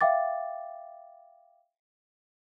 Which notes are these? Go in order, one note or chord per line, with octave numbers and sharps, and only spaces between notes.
E5 F5 G5 D6 A6